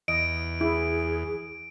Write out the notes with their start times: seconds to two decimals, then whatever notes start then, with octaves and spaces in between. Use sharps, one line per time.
0.08 E2 D#5 D7
0.61 E4 G#4